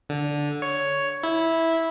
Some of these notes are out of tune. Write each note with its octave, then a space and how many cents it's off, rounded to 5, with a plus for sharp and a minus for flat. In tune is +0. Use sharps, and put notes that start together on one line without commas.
D3 -5
C#5 +5
E4 -10